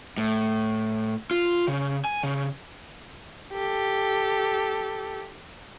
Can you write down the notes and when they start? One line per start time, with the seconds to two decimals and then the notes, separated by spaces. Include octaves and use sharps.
0.17 A2
1.31 F4
1.68 C#3
2.05 G#5
2.23 C#3
3.53 G4 A4